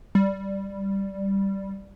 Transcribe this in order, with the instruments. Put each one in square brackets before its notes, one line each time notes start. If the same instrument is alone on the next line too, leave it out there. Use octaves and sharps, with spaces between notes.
[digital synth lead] G3